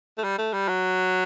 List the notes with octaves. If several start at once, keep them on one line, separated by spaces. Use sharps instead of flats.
A3
G3
A3
G3
F#3